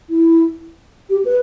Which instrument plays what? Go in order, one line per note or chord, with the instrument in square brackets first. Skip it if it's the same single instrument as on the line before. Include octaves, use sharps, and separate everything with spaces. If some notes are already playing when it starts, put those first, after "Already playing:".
[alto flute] E4
G4
B4